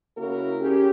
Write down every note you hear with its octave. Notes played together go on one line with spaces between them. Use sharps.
C#3 A#3 E4 F#4 A#4
C#4 G4 G#4